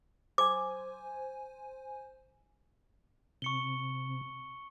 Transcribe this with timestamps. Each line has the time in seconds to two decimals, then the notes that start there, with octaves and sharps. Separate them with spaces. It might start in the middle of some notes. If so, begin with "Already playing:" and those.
0.38 C5 G#5 D6
3.42 C3 C#6 C#7 G7